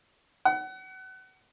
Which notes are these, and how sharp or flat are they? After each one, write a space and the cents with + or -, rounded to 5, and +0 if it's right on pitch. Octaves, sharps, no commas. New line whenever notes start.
F#5 +30